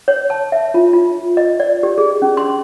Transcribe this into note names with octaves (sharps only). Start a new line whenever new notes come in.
C#5
A5
E5
F4
F4
D#5
D5
G4
G#4
C#4
C6